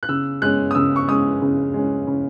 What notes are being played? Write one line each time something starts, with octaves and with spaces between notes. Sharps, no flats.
F#6
C#3 E6
G#3 C#4 F#6
D#6
C#3 E6
C#6
G#3 C#4 D#6
C#3
G#3 C#4
C#3